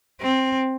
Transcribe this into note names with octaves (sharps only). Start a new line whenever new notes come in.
C4